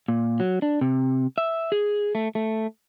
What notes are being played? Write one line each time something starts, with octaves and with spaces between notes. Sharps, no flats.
A#2
F#3
D4
C3
E5
G#4
A3
A3